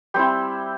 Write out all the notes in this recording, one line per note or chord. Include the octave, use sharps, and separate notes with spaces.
G3 C4 E4 G5